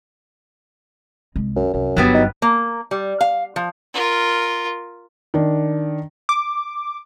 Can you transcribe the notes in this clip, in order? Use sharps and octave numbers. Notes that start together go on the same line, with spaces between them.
C2 G#3
F#2
C2 F#2
G1 G2 F#3 G3 B3
D#4
A#3
G3
F5
F3
F4 A#4
D#3 D4
D6